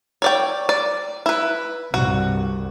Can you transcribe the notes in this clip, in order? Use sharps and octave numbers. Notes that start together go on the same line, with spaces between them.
C#5 D5 G5
D5
E4 B4
C2 G2 F#4